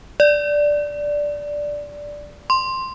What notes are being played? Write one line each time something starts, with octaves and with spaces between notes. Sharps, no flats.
D5
C6